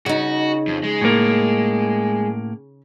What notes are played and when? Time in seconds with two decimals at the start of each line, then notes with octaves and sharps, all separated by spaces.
0.06 C#3 D#4 F#4
0.67 F2
0.83 G#3
1.01 A2 A#3